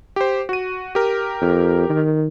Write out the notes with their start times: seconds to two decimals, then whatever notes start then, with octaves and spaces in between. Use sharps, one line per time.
0.16 G4 C5
0.49 F#4 D#7
0.95 G4 A#4
1.41 F2
1.89 D#3